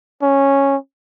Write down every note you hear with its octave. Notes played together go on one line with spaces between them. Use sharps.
C#4